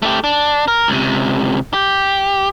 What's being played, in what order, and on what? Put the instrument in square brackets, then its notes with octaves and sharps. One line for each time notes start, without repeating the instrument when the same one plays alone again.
[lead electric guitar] A3 G4
D4
A#4
C#2 C3
G4